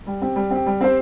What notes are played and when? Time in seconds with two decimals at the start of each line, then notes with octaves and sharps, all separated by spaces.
0.07 G3
0.22 C4 G4
0.36 G3
0.51 C4 G4
0.66 G3
0.81 C4 G4 C5